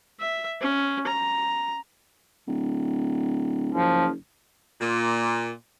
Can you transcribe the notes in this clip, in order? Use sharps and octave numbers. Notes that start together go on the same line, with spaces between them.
E5
C#4
A#5
D1
F#1 F3
A#2